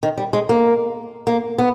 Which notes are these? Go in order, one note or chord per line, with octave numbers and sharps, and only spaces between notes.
D#3
G3
G#3
A#3
A#3
B3